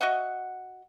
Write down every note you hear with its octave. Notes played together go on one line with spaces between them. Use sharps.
F#4 D#5 E5 F#5